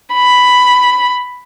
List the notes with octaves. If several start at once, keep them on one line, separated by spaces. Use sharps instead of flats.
B5